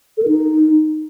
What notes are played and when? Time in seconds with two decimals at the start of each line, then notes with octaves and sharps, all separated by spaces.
0.17 A4
0.23 A#4
0.28 D#4